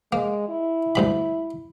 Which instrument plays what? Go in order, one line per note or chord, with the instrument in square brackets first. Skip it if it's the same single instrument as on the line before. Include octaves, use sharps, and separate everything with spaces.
[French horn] G#3 [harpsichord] A#3
[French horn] E4
[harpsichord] D2 G2 B5